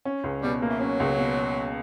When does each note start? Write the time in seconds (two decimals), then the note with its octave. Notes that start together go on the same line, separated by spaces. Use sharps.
0.05 C#4
0.24 C#2
0.42 B2 G3
0.62 A#3
0.69 E3
0.80 F#3 C#4
1.00 C#2
1.19 B2